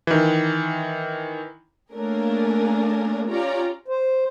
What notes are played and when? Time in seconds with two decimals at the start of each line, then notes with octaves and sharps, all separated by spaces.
0.07 D#3 E3
1.93 A3 A#3 C#4 D4 G#4 A#4
3.30 C#4 F4 G4 C#5 D5 A#5
3.88 C5